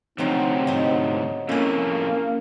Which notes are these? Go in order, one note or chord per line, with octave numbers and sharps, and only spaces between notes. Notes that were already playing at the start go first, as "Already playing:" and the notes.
D2 C3 F3 F#3 C4 D#4
G#2 F#3 D#4
F2 A2 A#3 C#4 G#4 A4